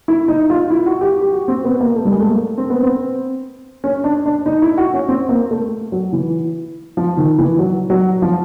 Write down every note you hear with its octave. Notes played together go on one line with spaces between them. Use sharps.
E4
D#4
F4
E4
F#4
G4
G4
F#4
C4
B3
A#3
A3
G3
G#3
A3
A#3
C4
B3
C4
C#4
D4
D4
D#4
E4
F#4
C#4
C4
A#3
A3
F#3
E3
F3
D#3
E3
F#3
F#3
F3